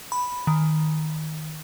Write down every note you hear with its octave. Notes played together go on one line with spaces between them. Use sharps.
B5
D#3